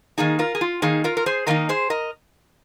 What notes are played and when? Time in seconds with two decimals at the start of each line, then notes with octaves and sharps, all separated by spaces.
0.18 D#3 A#3 D#4 G#4
0.39 F4 A#4
0.55 G#4
0.61 F4
0.82 D#3 A#3 D#4 G#4
1.04 F4 A#4
1.17 A#4
1.26 G#4 C5
1.47 D#3 A#3 D#4 A#4 D#5
1.69 G#4 C5
1.90 A#4 D#5